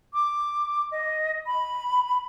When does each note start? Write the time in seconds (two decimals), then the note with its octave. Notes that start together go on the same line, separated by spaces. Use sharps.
0.13 D6
0.91 D#5
1.46 B5